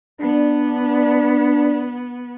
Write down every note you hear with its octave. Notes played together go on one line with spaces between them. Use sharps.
B3 D4